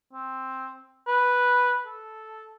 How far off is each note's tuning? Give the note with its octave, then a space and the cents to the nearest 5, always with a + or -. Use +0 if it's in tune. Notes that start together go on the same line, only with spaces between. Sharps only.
C4 +5
B4 -5
A4 -5